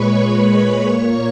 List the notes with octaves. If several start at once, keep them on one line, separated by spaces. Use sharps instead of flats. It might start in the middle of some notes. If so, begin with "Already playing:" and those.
Already playing: A#2 G#3 B4 C#5 B5 C#6
B4 B5
A#2 A#3 C#5 C#6